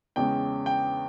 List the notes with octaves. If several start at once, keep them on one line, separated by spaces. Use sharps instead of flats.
E2 C#3 G#3 C#4 G5
G5